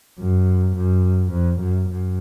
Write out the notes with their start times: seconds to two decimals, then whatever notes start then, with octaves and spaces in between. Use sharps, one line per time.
0.19 F#2
0.76 F#2
1.32 F2
1.61 F#2
1.89 F#2